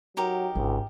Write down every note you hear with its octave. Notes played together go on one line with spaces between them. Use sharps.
F#3 D#4 G4 A#4
G#1 C#2 D3